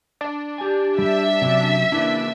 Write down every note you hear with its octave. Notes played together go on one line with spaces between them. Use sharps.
D4
G4 G#5
G3 E5
F#2 C3 F#3 C#4
C#3 E3 A#3 D4 E4